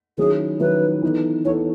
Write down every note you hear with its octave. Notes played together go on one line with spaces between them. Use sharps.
D#3 F#3 C#4 E4 G#4
D#3 F#3 C#4 E4 B4
E3 B3 D#4 A4
E3 B3 D#4 A4 C#5